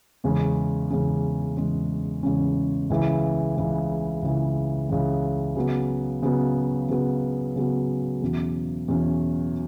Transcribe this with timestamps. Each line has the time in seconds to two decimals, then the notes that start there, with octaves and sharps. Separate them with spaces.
0.24 E2 C#3 G#3 C#4
0.90 E2 C#3 G#3 C#4
1.57 E2 C#3 G#3 C#4
2.23 E2 C#3 G#3 C#4
2.90 C#2 C#3 E3
3.56 C#2 C#3 E3
4.22 C#2 C#3 E3
4.89 C#2 C#3 E3
5.56 C#3 F#3 B3
6.22 C#3 F#3 B3
6.89 C#3 F#3 B3
7.56 C#3 F#3 B3
8.22 E2 B2 F#3 C#4
8.88 E2 B2 F#3 C#4